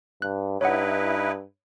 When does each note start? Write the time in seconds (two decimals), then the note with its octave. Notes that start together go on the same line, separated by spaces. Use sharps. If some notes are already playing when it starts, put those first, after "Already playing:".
0.22 G2 F#6
0.61 G2 D#4 E4 B4 C#5 F#5